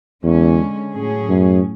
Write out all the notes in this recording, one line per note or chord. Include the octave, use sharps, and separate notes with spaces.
E2 D3 G#3 C#4
A2 F#3 C#4 G#4
F#2